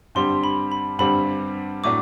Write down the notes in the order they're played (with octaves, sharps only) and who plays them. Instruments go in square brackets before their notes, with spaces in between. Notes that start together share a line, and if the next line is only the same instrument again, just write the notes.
[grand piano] G2 D3 G3 C4 G4 [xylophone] C6
[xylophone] B5
B5
[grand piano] G2 D3 G3 C4 G4 [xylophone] B5
[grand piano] A2 F#3 A3 D4 F#4 [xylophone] D6